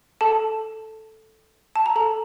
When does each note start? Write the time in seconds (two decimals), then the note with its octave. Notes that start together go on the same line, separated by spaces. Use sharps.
0.21 A4 A5
1.76 A5
1.86 A#5
1.96 A4 A5